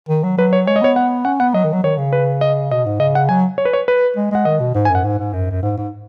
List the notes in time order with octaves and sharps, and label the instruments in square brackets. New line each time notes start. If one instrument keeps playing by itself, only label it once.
[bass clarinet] D#3
F#3
[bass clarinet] F#3 [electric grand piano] B4
[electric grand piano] C#5
[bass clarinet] G#3 [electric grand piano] C#5
[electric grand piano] D#5
[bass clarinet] B3 [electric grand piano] C#5
[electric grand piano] F#5
[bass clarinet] C#4 [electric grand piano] F#5
[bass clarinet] B3 [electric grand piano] F#5
[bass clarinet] F#3 [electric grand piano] D#5
[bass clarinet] D#3
F#3
[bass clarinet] D#3 [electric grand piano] C#5
[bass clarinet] C#3
[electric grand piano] B4
D#5
[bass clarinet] B2 [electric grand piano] D#5
[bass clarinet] G#2
[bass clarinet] C#3 [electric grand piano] D#5
[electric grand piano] F#5
[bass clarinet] F#3 [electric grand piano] G#5
[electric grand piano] C#5
B4
C#5
B4
[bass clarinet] G#3
[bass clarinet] G#3 [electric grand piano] F#5
[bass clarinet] D#3 [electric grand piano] D#5
[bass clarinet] B2
G#2
[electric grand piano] G#5
[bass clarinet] F#2
[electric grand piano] F#5
[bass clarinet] G#2
G#2
F#2
F#2
G#2
G#2